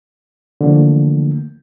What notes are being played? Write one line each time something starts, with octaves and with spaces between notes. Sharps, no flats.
D3 E3 F3 A3 A#3